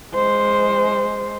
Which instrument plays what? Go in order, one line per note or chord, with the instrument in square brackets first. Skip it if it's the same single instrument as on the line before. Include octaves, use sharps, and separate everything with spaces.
[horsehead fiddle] G#3 C5